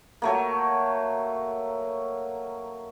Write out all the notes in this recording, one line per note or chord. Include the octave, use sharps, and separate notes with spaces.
F#3 A3 A#3